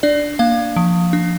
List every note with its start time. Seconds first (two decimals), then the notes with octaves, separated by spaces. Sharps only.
0.03 D4 D5
0.39 A#3 F5
0.76 F3
1.13 D4